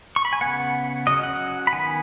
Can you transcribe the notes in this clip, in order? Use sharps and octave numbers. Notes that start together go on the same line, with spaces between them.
C#6
B5
G#5
C#3 B3 F#5
F#3 C#4 D#5
F#5
B5
D#3 B3 G#5